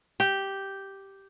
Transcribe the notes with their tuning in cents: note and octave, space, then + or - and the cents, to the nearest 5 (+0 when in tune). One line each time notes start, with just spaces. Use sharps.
G4 -5